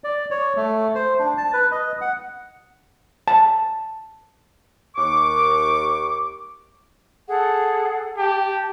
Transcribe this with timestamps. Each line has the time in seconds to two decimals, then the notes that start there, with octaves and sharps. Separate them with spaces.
0.04 D5
0.31 C#5
0.57 A3
0.95 C5
1.19 D4
1.37 A5
1.53 B4
1.71 D#5
2.01 F#5
3.28 A5
4.96 D#2 C#6 D6
7.28 G#4 A4 F#5
8.18 G4 A5